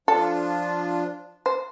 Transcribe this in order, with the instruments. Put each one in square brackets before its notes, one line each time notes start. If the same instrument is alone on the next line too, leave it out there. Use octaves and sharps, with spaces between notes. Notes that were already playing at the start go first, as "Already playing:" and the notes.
[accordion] F3 D4 F4 [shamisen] A4
[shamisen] C5